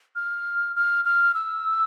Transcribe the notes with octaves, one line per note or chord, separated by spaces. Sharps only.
F6
F6
F6
E6